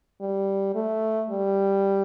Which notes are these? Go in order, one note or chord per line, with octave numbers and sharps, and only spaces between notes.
G3
A3
G3